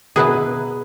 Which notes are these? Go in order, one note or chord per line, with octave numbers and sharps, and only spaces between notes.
B2 F#3 B3 E4 G#4 B4